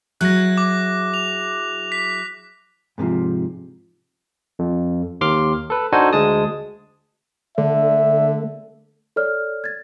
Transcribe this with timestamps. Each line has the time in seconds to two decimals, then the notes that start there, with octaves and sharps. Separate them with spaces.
0.21 F#3 E4 G#4 F#6 A#6
0.58 D6
1.14 F7
1.92 B6
2.98 G#2 C3 D#3 F3
4.59 F2
5.21 D#2 C6 D6 F6
5.70 A4 B4
5.92 D4 D#4 F#4 A4 C5 G#5
6.13 D2 G#3 A5 D#6
7.58 D3 A3 E5
9.16 A4 C#5 D5 F6
9.64 G#6 A6